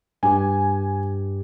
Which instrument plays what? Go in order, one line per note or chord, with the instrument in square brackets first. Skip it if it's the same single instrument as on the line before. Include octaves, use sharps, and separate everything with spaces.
[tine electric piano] G2 G4 [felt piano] G#5